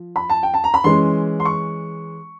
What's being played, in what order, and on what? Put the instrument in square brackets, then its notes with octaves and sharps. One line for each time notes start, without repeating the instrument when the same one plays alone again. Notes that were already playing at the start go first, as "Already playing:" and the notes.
Already playing: [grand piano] F3
B5
A5
G5
A5
A#5
B5
E3 G#3 C#4 C6
C6
C#6